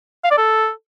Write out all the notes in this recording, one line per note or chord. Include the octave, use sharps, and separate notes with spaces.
F5
D5
A4